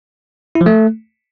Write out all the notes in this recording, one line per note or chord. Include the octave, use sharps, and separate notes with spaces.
E4
F3
A3